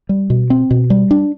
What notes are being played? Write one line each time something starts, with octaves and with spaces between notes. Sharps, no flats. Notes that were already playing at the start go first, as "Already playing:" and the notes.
G3
B2
C4
B2
G3
D4